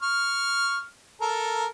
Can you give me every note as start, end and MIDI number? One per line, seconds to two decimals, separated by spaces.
0.02 0.85 85
0.02 0.85 89
1.21 1.67 69
1.21 1.67 70